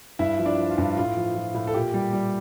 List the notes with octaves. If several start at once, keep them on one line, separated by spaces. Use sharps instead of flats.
G2 E4 E5
F3
D4 D5
F3
F4
G2
A2 F4
F3
F3
A2
A4
A#2 G4
G3
G3